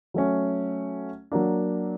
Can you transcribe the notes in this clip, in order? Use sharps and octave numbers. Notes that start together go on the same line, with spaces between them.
F#3 A3 C#4
F#3 A#3 D4